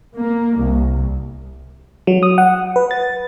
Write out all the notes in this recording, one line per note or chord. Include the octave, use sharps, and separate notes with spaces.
A#3
C2
F#3
D#6
F#5
B4
A6